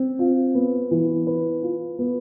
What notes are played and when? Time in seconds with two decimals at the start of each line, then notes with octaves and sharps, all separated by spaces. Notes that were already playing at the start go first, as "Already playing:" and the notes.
Already playing: C4
0.19 F4
0.55 B3
0.91 E3
1.27 B4
1.63 F4
1.99 B3